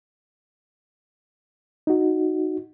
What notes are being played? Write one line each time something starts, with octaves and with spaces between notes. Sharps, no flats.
D#4 F#4